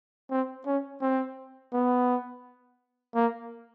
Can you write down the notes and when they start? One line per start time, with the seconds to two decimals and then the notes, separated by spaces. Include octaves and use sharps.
0.30 C4
0.66 C#4
1.02 C4
1.73 B3
3.15 A#3